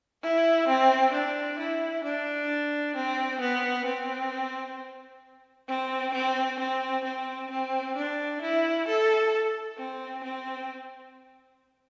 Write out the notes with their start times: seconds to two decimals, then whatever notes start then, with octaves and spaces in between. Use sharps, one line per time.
0.23 E4
0.68 C4
1.13 D4
1.59 E4
2.04 D4
2.96 C4
3.40 B3
3.86 C4
5.68 C4
6.14 C4
6.59 C4
7.04 C4
7.51 C4
7.96 D4
8.42 E4
8.88 A4
9.78 C4
10.24 C4